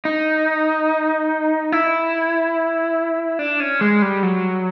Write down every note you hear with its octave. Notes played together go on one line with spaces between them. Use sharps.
D#4
E4
D4
C#4
G#3
G3
F#3